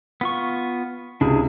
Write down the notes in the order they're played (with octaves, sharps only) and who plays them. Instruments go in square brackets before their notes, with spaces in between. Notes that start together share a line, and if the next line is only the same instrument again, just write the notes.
[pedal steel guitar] B3 F4 C#6
[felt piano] C#2 C3 [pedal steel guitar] D4 E4 G#4